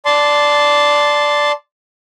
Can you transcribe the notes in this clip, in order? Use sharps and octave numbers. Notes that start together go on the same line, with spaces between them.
D5 A5 C6